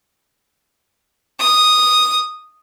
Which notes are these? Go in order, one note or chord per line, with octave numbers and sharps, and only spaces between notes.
D#6